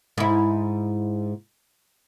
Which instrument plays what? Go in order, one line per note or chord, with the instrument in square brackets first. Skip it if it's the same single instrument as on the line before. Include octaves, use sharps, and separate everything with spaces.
[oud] G#2 E4